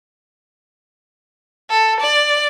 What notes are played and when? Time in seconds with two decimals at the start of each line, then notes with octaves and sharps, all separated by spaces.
1.70 A4
2.01 D5